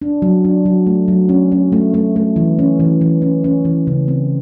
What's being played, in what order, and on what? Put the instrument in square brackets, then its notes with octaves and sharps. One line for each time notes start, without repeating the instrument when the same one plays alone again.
[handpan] D4
F#3
D4
F#3
A3
F#3
C#4
C#4
A3
A3
A3
E3
C#4
E3
E3
C#4
C#4
E3
C#3
C4